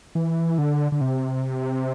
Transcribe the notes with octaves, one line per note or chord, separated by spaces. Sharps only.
E3
D3
D3
C3